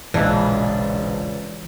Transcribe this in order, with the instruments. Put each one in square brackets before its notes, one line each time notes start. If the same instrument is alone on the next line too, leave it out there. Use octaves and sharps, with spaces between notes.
[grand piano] E1 A#1 D#5 [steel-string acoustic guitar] C#3 D4 [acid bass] E3